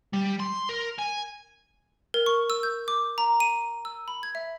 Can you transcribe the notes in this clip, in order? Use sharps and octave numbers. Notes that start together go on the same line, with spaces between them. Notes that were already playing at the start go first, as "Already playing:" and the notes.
G3
C6
A#4
G#5
A#4
C#6
E6
G6
D6
A#5
D#7
E6
B5
G#6
E5